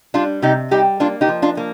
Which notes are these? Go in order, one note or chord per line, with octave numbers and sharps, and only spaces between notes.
G3 D4 F4
C3 D#4 G4
G3 D#4 G4
A#3 D4 F4
D#4 G4
F3
D4 F4
A#3